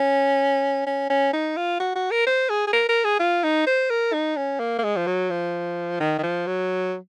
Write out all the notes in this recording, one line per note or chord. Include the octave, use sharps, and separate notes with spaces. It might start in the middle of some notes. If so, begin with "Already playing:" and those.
Already playing: C#4
C#4
C#4
D#4
F4
F#4
F#4
A#4
C5
G#4
G#4
A#4
A#4
G#4
F4
D#4
C5
A#4
D#4
C#4
A#3
A#3
G#3
F3
F#3
F3
D#3
D#3
F3
F#3